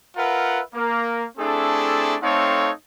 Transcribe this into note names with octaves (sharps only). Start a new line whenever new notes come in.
F4 A#4 B4 E5 F#5
A#3 A#4
A3 C4 D4 E4 G#4 A4
A3 C4 D#4 A4 C#5 F5